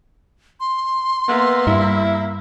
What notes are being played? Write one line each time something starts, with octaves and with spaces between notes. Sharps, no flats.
C6
A#3 B3 E5
G2 E4